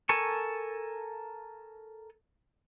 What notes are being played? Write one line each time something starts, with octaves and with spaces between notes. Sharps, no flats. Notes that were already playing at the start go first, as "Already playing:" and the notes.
A4 A#4 G#5 A5 C#6